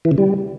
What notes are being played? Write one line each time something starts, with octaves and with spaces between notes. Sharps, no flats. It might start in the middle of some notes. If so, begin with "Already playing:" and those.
E3
C#3
G3